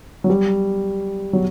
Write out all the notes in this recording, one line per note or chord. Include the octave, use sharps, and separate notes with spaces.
F#3
G3
F#3